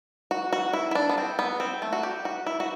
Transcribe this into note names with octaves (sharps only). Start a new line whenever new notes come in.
F#4
F#4
E4
E4
D4
B3
C4
B3
C4
A3
F#4
G4
F#4
E4
F#4